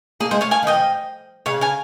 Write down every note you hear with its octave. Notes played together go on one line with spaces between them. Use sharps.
A#3 G#4
G#3 C5
C#5 F5
F5 G#5
D#3
D#5 G5
F3
C#3 C#5 F5
F5 G#5